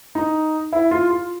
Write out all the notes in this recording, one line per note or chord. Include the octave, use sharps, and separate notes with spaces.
D#4
E4
F4
F4